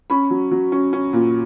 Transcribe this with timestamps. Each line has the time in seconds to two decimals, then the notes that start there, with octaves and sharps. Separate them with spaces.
0.10 C#4 B5
0.30 F#3
0.51 F#3
0.72 C#4
0.93 C#4
1.13 A#2